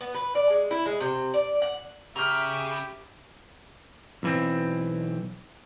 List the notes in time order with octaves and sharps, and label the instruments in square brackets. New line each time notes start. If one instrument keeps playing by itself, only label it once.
[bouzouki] B3
B4
D5
G#3
E4
G#3
C3
D5
F#5
[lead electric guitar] C#3 [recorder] G4 [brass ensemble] E5 [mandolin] A#5 F6
[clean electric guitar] B1 E3 C4